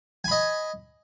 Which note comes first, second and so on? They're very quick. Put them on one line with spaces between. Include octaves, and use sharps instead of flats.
G#5 B5 D#5